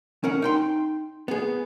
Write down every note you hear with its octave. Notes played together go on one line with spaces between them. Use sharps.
C#4 A#4 F#5
D#4 G5 C6
B3 G#4